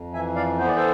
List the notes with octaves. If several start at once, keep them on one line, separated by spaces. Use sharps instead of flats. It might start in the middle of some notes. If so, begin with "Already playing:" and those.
Already playing: F2
E3 E5 G#5
D5 F5
B3 C5
D5
A4 C5